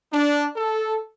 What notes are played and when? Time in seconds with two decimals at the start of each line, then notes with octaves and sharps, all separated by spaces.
0.12 D4
0.56 A4